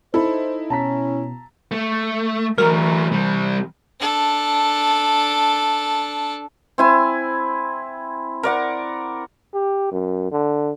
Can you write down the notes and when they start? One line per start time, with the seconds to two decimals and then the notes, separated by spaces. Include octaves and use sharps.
0.14 D#4 E4 A4 C5 B5
0.70 B2 C#4 A5 A#5 B6
1.71 A3
2.58 E3 F#3 A3 A#4
3.12 C3 G3
4.00 D4 A4
6.78 C4 E4 G#5
8.43 A#4 D5 F#5
9.54 G4
9.92 F#2
10.31 D3